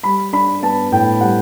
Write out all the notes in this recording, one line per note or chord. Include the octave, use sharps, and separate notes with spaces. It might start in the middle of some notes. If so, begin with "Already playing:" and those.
G3 B5
D4 B5
B3 A5
A2 G5
G3 F#5